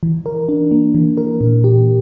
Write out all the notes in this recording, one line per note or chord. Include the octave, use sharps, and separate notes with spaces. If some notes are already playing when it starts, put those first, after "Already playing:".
E3
A#4
D4
A#3
E3
A#4
A#2
G4